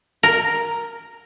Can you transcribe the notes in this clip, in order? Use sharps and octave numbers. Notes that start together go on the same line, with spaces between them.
A#4